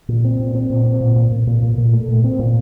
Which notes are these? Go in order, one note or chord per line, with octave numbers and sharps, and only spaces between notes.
A#2
C4
A#2
C4
A#2
C4
A#2
A#2
A#2
A#2
A#2
A#2
A3
A#2
C4
A#2